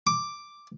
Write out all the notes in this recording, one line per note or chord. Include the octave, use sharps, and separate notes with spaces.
D6